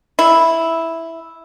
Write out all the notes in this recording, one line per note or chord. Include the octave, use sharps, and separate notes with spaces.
E4